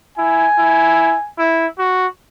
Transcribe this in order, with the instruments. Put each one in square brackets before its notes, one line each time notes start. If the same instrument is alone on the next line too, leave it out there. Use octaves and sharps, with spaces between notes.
[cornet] E4 [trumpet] G#5
[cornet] E4
E4
F#4